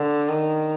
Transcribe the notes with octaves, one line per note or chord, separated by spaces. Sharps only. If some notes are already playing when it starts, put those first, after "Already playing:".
Already playing: D3
D#3